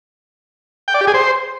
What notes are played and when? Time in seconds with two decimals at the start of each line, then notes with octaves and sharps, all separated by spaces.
0.88 G5
0.94 D5
1.01 G4
1.07 G#4
1.14 C5